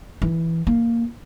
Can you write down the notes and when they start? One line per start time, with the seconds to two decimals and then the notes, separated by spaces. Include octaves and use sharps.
0.22 E3
0.67 A#3